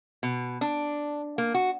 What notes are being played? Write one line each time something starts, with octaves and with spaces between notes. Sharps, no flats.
B2
D4
A#3
F#4